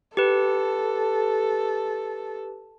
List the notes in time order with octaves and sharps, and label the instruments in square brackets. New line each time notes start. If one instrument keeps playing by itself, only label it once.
[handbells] G4 B4 [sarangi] A4